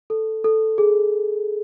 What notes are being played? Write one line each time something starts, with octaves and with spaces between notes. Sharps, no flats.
A4
A4
G#4